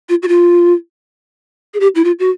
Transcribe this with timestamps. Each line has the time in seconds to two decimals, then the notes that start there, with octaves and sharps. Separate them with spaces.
0.09 F4
0.23 F#4
0.28 F4
1.74 G#4
1.80 G4
1.95 E4
2.04 F4
2.19 F#4